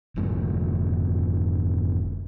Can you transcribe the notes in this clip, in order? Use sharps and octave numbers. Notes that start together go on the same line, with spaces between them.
F1 F2 G#2